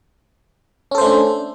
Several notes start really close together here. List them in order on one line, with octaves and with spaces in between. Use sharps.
C#4 A4 C5 A3 D4